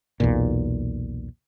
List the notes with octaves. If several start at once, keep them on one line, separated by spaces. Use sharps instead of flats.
B1 E2 A#2